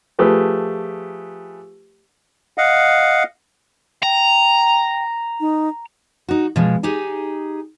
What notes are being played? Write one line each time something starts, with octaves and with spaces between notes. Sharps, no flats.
F3 A3 G4 G#4 B4
D#5 F5 F#5
G5 A#5
D#4
D#4 F#4
B2 F3 G#3
D#4 G4 G#4 G#5